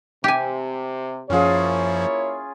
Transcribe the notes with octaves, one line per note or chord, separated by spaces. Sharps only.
C3 G4 G#5
F#2 F3 A#3 C#4 E4 F4 G#4 C#5